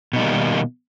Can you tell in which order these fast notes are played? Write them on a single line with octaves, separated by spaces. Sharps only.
B2 D#4 G3 A#3 D#3